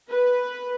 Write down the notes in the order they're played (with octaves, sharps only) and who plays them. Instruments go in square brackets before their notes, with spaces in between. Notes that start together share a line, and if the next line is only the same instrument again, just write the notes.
[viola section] B4